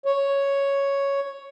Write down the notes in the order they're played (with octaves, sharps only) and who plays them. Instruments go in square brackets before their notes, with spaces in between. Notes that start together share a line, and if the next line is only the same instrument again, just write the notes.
[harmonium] C#5